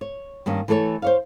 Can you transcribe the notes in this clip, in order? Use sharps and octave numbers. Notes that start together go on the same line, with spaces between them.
C#5
G2 D#3 A#3 C#4
E3 A3 A4 A#4 C#5
C5 C#5 F5